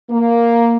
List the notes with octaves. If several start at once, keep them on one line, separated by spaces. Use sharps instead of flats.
A#3